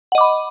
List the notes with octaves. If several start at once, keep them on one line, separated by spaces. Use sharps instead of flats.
D#5 F#5 B5 D6